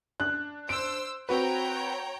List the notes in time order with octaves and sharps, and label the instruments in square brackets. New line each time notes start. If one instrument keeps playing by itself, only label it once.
[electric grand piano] D4 [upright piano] F#6
[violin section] C5 E6 [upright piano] D7
[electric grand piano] C4 F#4 B4 [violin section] C#5 G5 A#5